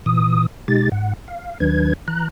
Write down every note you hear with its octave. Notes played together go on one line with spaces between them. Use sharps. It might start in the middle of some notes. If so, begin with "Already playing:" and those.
A#2 E3 D#6
B2 G#3 D#4 G4 A6
G#2 F#5
F5
D#2 D#3 F#3 D4 B4 G#6
E3 A#5 F#6